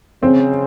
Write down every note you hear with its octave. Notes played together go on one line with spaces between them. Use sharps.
C#3 C4